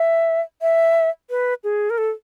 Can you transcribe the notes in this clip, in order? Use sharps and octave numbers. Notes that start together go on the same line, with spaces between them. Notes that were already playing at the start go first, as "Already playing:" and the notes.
Already playing: E5
E5
B4
G#4
A#4
A4